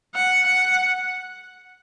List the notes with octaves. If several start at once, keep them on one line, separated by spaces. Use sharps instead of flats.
F#5
F#5